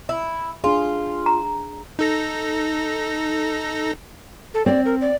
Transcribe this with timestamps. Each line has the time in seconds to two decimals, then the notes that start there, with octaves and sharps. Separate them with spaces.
0.09 E4
0.64 D4 F4 G#4
1.26 A#5
1.99 D#4 A4 A#6
4.54 A4
4.66 C4 D5
4.85 A#4
5.01 D5